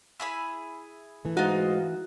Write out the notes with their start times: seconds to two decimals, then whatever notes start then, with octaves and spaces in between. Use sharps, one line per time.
0.20 E4 G#4 B5
1.25 E3 A3
1.37 G#2 D#4 F4 F#4